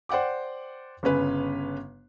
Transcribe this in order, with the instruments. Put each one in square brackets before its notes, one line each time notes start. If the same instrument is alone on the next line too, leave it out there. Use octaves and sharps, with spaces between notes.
[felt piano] C5 D5 F#5 G5 D6
G1 C#3 C#4 B4